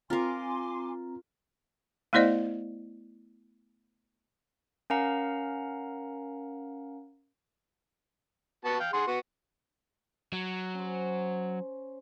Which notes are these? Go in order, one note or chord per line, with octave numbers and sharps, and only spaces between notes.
C4 F4 A#4 G#5 A#5 C6 D6
A3 B3 E4 C5 D5 D#5
C#4 A#4 F5 F#5 A#5
B3 F#4 A5
F5 G5
G#4 F#5 C6
B3 F#4
F#3
C#4 C5